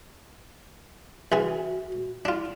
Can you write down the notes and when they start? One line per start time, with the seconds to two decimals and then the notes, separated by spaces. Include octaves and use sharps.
1.32 C2 E3 F#4 G#4
2.25 D4 E4 F4